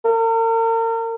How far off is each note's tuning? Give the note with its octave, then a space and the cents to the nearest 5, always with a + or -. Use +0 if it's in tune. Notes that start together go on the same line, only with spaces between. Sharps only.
A#4 -40